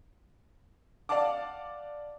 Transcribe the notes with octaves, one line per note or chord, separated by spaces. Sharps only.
D5 F5 F#5 A5 D6